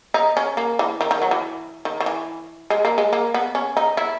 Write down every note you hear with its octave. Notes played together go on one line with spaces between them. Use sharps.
D#4
C#4
A#3
E3
D#3
D#3
F#3
E3
D#3
D#3
E3
G#3
A#3
G#3
A#3
B3
C#4
D#4
E4